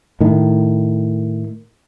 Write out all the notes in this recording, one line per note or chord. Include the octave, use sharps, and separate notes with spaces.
A2 D#3